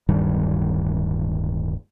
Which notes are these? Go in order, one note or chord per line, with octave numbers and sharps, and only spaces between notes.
D1 G2 D#3 G3